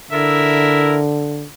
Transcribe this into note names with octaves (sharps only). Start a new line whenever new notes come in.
D3 E4 A#4 E5